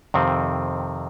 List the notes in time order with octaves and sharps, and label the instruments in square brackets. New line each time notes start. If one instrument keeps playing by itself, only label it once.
[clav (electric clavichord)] F2 C3 D#3 C4